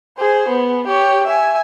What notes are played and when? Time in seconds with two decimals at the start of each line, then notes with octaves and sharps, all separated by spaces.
0.18 G#4 C5
0.48 B3
0.87 G4 C#5
1.27 E5 G#5